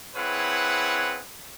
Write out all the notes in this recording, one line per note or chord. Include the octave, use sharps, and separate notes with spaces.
C4 E4 G#4 B4 C#5 F#5